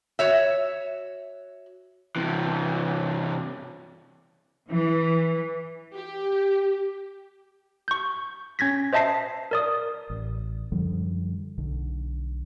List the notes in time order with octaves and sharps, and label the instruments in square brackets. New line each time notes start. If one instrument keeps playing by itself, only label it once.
[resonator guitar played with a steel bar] F#4 C#5 E5
[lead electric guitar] C3 E3
[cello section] E3
[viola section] G4
[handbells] C#6 G6
C#4 G#6 A#6 B6
C5 D#5 E5 A5 A#6 C7
A#4 D5 D#6
[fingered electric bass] A1
F#2 D3 F3 G3
B1 D3